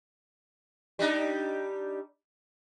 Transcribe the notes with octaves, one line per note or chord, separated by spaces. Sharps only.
G3 D4 D#4